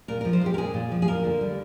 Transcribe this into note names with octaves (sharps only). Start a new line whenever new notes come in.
A#2 A#4
A#4
F3
C5
G#3 G4
A#4
A#2 G#4
A#2
F3
G#4
A#3 A#4
D3
G3